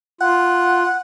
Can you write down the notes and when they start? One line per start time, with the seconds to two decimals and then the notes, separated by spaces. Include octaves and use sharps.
0.21 F4 F#5